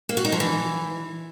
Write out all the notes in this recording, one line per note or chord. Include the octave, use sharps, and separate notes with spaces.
A#3
F#4
D#4
F3
E3